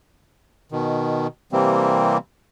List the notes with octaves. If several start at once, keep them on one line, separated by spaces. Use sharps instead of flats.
B2 D#3
C3 E3 G3 A#3 C4